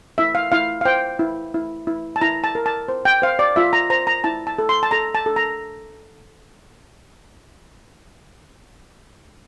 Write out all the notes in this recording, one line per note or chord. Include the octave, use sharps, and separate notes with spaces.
E4 E5
F5
E4 F5
F5
C5 G5
E4
E4
E4
A5
E4 A#5
A5
A#4
A5
C5
G5
C5 F5
D5
F4 E5
A#5
C5 A#5
A#5
E4 A5
A5
A4
C6
A5
A4 A#5
A5
A4
A#5